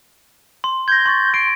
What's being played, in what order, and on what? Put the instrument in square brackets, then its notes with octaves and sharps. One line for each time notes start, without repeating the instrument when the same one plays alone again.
[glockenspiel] C6
[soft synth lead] G6 [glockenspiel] G#6 A#6
[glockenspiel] C6 C#6 A6
[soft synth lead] C6 [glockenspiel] D7